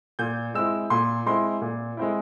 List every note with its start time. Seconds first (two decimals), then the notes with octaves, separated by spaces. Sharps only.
0.19 A#2 G6
0.54 G#3 C4 E4 E6
0.90 A#2 C6
1.26 G#3 C4 E4 C6
1.62 A#2
1.97 G#3 C4 E4